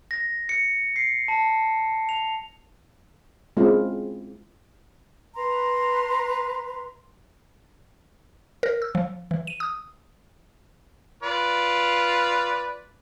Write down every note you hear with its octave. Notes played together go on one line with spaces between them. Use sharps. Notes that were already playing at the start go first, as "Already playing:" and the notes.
A#6
C#7
C7
A5
F7
G#3 C4 C#4 E4 F4
B4 A#5 C6
A#4
E6
F3
E3
D#7
D#6
F4 B4 D5